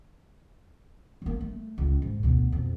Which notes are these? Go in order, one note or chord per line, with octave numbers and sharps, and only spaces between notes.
F#3 A#3
A3
C#2
G#2
D2 B2
F2 B2